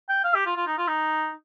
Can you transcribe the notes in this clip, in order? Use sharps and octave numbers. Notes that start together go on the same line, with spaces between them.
G5
F5
G4
F4
F4
D#4
F4
D#4